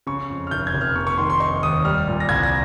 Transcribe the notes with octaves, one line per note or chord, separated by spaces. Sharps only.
C#3 C#6
F2
F6
F1 G6
G#6
F1
F6
A#3 C#6
C#6
D#3 C6
C6
D#4 C#6
D#2 D#6
G3 F6
A#2
A#6
C2 G#6
A#6